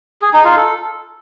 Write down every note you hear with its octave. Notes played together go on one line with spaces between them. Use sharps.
G#4
D#4
F4
A4